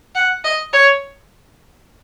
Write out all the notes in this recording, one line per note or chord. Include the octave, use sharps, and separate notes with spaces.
F#5
D#5
C#5